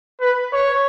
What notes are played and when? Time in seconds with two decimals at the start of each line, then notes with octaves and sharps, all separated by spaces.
0.21 B4
0.53 C#5